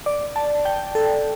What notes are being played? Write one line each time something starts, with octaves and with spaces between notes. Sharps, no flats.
D5
A5
G5
A4